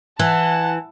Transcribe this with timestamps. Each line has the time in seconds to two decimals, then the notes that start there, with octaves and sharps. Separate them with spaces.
0.19 E3 F#5 A5